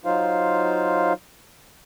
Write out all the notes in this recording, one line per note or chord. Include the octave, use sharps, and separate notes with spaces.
F#3 D#4 F4 C5 F5